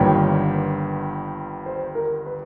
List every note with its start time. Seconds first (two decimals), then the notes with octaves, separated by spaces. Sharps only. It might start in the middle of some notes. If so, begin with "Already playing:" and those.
Already playing: G1 G2 D#3 G3 A#3 C#5
1.66 C5
1.95 A#4
2.26 B4